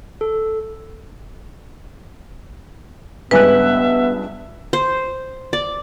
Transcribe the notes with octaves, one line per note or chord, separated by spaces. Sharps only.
A4
C#2 G2 B3 B4 E5 G#5 F#6
C5
D5